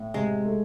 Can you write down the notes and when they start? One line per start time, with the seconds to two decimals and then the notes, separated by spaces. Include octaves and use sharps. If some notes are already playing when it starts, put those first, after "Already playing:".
Already playing: A2
0.14 C3 G#3
0.45 A3